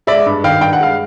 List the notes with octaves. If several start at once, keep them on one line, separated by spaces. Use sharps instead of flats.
G#3 D5 E5
G2
D#3 F5 G5
G2 G5
F#5
G#3 F5